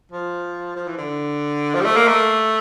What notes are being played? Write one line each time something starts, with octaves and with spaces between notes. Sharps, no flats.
F3
F3
E3
D3
F3
G3
A3
A#3
A3